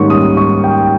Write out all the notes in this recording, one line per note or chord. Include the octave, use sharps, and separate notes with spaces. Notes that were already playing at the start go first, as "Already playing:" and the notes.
Already playing: G#2 D#3 G3 A#3 C#4 C6 C#6
D#6
C#6
G5